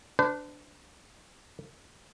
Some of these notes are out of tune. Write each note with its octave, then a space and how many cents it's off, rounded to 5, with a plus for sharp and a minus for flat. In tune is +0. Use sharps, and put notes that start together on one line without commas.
D4 +0 C5 -45